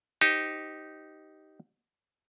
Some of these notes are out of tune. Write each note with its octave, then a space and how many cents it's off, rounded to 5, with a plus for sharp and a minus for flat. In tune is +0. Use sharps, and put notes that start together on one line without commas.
D#4 +0 G4 -10 C5 -20